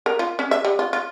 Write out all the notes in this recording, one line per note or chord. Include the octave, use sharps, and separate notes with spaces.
A#4
F4
C#4
E5
G3
F4
F4